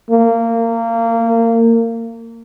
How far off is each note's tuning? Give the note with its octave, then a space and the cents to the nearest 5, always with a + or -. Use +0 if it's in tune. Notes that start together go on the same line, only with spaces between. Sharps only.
A#3 -25